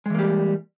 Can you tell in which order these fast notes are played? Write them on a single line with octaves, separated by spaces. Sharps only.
G#3 E3 A#3 G3